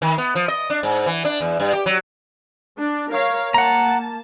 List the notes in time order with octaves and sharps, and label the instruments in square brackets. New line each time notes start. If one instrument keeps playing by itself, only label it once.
[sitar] D#3
B3
F3
D#5
D4
G#2
E3
D4
E2
G2
G4
F#3
[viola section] D4
A#4 C#5 F5
[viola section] A#3 A5 [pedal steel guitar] F#5 A#5